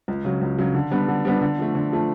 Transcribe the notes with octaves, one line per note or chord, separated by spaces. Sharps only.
C#2
C#3 F#3
C#2
C#3 F#3
D3
G3 B3 D4
D3
G3 B3 D4
D3
F3 A3
D3
F3 A3